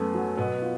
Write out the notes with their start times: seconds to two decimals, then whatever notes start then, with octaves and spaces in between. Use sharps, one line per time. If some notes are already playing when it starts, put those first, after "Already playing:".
Already playing: F#2 A3 B3
0.14 F#3
0.37 B2 B3
0.62 F4